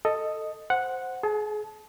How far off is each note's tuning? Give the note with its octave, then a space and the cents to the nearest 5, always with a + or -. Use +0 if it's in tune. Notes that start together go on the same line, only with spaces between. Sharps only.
A4 +10 D#5 +0
C5 +0 F#5 -5
G#4 +30 A5 -20